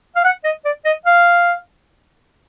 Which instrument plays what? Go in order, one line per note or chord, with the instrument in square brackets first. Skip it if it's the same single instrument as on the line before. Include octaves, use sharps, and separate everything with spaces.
[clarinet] F5
F#5
D#5
D5
D#5
F5